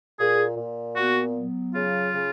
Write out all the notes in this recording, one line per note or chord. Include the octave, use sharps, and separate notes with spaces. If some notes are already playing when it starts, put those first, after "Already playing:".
A#2 G#4
A#2
B3 F#4
F#3
C#3 F4
C#3